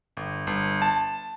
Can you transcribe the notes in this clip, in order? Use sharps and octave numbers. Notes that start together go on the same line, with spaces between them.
G1
G1
A5